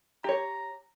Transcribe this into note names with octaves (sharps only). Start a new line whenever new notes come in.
G4 C#5 A#5